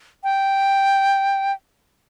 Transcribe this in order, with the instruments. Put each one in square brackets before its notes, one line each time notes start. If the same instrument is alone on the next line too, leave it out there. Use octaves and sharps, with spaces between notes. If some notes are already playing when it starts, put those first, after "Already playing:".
[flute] G5